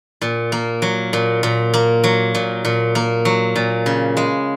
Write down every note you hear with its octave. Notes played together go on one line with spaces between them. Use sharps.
A#2
A#3
F#3
A#2
A#2
A#3
F#3
A#2
A#2
A#3
F#3
A#2
C#3
G#3